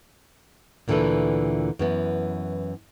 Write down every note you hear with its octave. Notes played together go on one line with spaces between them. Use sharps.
D2 A#2 D3 E3 A4 B4
F#2 E3 B3